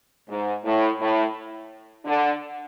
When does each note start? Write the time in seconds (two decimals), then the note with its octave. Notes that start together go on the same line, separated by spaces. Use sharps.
0.28 G#2
0.64 A2
0.99 A2
2.05 D3